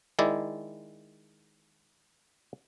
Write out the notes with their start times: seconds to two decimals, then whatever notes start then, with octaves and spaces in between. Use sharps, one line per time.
0.19 D#3 G#3 E4 D5